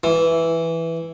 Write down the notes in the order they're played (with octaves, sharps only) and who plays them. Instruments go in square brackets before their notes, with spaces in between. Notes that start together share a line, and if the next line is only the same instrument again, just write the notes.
[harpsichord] E3